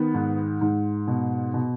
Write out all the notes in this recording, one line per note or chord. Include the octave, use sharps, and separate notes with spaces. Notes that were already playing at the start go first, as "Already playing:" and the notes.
Already playing: D#3 B3
G#2
G#2
B2
B2